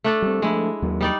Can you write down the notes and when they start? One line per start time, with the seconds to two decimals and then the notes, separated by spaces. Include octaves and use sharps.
0.04 A3 D4 A4
0.22 G3 C4
0.42 F3 G#3 A3 D4 E4
0.82 D#2 F#3 A#3
1.01 G3 D#4 D5